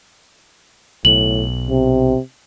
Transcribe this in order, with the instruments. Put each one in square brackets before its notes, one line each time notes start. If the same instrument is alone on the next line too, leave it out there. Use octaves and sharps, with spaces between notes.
[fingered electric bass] B1 [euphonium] A2 [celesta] F#7
[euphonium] C3